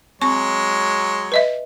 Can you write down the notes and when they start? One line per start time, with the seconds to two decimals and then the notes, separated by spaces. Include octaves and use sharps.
0.22 F#3 G#3 C4 C#5 C#6
1.32 B4 D#5 E5